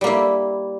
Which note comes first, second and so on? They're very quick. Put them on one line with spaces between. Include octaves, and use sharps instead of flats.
G3 A#3 E4